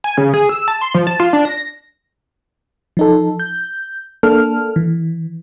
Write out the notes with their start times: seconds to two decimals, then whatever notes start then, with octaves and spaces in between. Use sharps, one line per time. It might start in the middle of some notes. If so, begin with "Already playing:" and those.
0.04 G#5
0.18 C#3
0.34 G#4
0.49 E6
0.68 A5
0.81 C6
0.94 F3
1.07 A5
1.20 F4
1.33 D4
1.45 A#6
2.97 F3 D#4 A4
3.40 G6
4.23 A#3 D4 A4 F6
4.76 E3